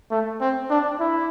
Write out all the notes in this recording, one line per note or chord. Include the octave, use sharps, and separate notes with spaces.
A3
C4
D4
E4